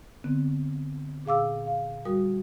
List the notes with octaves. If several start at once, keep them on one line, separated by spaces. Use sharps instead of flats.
D3 B3 C4
A#2 G#4 F5 D6 E6
F5
G3 F#4 A#4 D#6